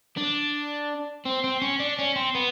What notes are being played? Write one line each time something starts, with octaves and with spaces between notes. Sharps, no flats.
D4
C4
C4
C#4
D4
C#4
C4
B3